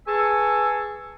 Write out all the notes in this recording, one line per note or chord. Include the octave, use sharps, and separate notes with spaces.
G#4 B4 G#5 A5 C#6 E6